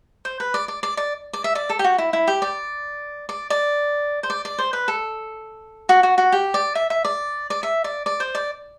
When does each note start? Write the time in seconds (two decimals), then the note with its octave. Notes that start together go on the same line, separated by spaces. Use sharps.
0.25 C5
0.40 B4
0.54 D5
0.68 D5
0.83 D5
0.97 D5
1.33 D5
1.44 E5
1.55 D5
1.70 A4
1.79 G4
1.84 F#4
1.98 E4
2.13 E4
2.27 G4
2.42 D5
3.29 D5
3.50 D5
4.23 C5
4.30 D5
4.45 D5
4.58 C5
4.73 B4
4.88 A4
5.89 F#4
6.03 F#4
6.18 F#4
6.32 G4
6.54 D5
6.75 E5
6.90 E5
7.05 D5
7.50 D5
7.63 E5
7.84 D5
8.06 D5
8.20 C5
8.35 D5